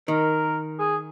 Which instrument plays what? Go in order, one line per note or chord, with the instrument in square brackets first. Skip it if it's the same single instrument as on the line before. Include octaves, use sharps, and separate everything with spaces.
[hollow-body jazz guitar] D#3 [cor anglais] A#4
[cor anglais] G#4